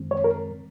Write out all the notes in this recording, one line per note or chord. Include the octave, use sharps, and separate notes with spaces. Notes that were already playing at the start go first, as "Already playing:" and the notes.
Already playing: F#2 D#3 G#3 C4
C#5
A#4